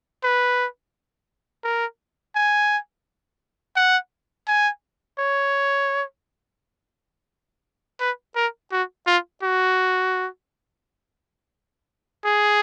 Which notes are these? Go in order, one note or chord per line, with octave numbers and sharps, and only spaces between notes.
B4
A#4
G#5
F#5
G#5
C#5
B4
A#4
F#4
F4
F#4
G#4